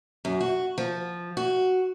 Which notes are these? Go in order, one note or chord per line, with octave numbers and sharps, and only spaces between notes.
F#2
F#4
F3
F#4